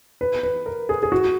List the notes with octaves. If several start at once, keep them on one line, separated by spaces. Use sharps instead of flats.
B4
B4
A#4
G#4
G#4
F#4